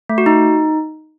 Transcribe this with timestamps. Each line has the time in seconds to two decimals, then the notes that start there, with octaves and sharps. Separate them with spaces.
0.09 A3
0.18 F#4
0.26 D#4